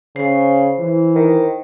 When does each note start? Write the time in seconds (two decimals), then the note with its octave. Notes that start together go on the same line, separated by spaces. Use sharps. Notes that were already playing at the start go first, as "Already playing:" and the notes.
0.16 C#3 C5
0.79 E3
1.15 D#3